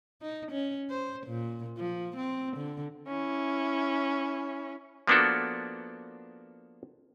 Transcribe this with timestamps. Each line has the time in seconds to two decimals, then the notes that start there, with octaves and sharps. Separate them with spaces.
0.22 D#4
0.51 C#4
0.90 C5
1.27 A#2
1.77 F3
2.16 C4
2.56 D3
3.08 C#4 E4
5.07 F3 A#3 B3 D4 F#4 A4